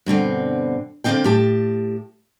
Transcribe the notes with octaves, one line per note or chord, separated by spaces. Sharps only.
G2 B2 D3 C4
D3 A#3 C4 D#4 F5 G5
A2 G4 A5